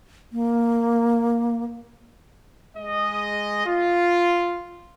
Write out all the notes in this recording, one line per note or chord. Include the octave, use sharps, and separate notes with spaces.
A#3
G#3 D#5
F4